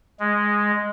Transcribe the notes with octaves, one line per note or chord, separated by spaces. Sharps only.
G#3